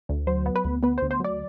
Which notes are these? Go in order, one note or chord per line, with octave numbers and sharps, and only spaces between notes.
D2
F#3 C5
B3
B4
D2
B3 B4
C5
D2
C5
F#3 D5